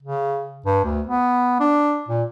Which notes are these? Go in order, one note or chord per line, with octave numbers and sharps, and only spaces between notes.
C#3
G2
D2
B3
D4
A#2